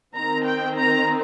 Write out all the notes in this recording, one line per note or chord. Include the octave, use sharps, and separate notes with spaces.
D#3 C4 A#5
G5
A#5